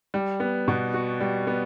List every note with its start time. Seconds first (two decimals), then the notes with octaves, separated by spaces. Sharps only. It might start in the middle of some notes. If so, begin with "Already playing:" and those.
0.14 G3
0.40 B3
0.68 B2
0.94 F#4
1.21 G3
1.47 B3